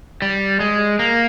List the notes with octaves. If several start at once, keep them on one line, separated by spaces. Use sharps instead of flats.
G3
G#3
A#3